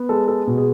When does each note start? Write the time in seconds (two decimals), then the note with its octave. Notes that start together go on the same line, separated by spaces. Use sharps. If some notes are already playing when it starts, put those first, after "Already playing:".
Already playing: B3
0.09 G#3 A4
0.28 A4
0.47 B2
0.58 G#4